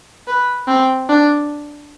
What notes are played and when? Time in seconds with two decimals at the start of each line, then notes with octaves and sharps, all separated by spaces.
0.28 B4
0.68 C4
1.09 D4